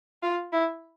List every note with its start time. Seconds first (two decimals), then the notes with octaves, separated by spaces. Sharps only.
0.23 F4
0.53 E4